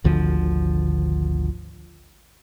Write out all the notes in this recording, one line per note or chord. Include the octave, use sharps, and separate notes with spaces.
G#1 D2 D3 F3